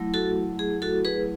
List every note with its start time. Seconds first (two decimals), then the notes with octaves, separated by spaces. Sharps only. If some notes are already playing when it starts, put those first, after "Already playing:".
Already playing: F#3 A3 E4
0.14 F#4 A4
0.59 G#4
0.82 F#4 A4
1.05 G#4 B4